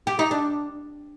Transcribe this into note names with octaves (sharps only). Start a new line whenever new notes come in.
G4
D#4
D4